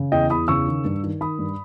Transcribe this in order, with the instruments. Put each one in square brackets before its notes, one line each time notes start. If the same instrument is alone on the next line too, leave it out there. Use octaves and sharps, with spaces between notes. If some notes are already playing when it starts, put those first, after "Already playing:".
Already playing: [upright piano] C#3
E2 D#5 G5
E2 B5 D#6
C#3 C#6 E6
D#3
G2
D#3
D#3 B5 D#6
G2